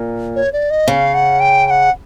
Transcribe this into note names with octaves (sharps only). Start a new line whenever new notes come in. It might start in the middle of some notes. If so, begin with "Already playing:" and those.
Already playing: A#2
C#5
D5
D#5
C#3 F5
F#5
G5
G5
F#5